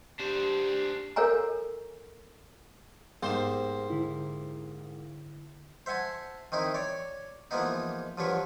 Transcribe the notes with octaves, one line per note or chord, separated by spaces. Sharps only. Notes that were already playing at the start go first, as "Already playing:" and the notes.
D4 G4 C5
A4 A#4 C#5 F5 G#5 A#5
G#2 A#3 B3 G4 C5
D3 E4
C5 E5 F#5 G#5 A5
D#3 C4 D#4 E4
C#5 D5
E3 F3 G#3 A#3 B3 D#4
G2 D3 F3 F#3 B4 C#6